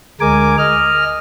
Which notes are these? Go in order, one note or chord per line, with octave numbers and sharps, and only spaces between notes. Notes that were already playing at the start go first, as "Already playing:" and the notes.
D2 G#3 A#4 G#5 D6
D#5 F6